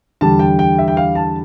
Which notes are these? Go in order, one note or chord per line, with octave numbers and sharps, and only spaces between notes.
E2 D3 G3 A5
G5
G5
E5
G5
F5
A5